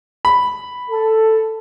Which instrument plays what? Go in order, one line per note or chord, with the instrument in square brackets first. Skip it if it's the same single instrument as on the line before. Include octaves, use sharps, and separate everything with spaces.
[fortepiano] B5
[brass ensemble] A4